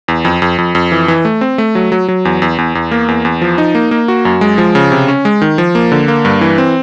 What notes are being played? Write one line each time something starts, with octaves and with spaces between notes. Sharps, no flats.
E2
F2
F2
F2
F2
E3
E3
A3
C4
A3
F#3
F#3
F#3
E2
E2
E2
E2
A#3
E2
E2
F3
D#4
A#3
A#3
F#4
F#2
G#3
F3
C#3
C3
C#4
G#3
D#3
F3
A#3
D3
A#3
G2
E3
C4